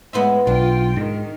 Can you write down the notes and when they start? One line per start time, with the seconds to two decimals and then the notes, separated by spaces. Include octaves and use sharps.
0.13 A2 G#3 B3 C5 E5
0.47 B1 D4 F4 G5
0.96 G#2 D#3